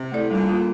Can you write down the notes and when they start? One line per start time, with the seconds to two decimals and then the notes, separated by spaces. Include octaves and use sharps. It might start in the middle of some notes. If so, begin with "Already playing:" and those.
Already playing: C3
0.12 A3 E4 A4 D5
0.31 A#2 D3 G3
0.49 A#3 F4